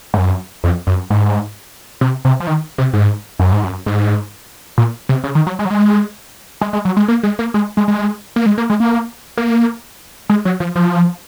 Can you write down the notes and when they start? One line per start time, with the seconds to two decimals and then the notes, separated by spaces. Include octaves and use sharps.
0.14 G#2
0.17 F#2
0.64 F2
0.87 F#2
1.10 G#2
2.01 C3
2.25 C3
2.40 F3
2.47 D#3
2.78 C3
2.93 G#2
3.39 F#2
3.52 G#2
3.64 F#2
3.86 G#2
4.78 A#2
5.09 C3
5.24 C#3
5.35 D#3
5.47 F#3
5.59 G#3
5.65 F#3
5.71 G#3
6.61 G#3
6.73 G#3
6.85 F#3
6.97 G#3
7.08 A#3
7.23 G#3
7.39 A#3
7.54 G#3
7.77 G#3
7.88 G#3
8.36 A#3
8.46 G#3
8.58 A#3
8.70 G#3
8.80 A#3
9.37 A#3
10.30 G#3
10.45 F#3
10.60 F3
10.76 F3